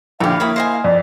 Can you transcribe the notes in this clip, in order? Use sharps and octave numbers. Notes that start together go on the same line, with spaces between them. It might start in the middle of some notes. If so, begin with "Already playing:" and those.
A#1 D3 E4 G4 F5
A#3 E4 C#5 B5 D#6
C5 D#5 G#5
F2 D5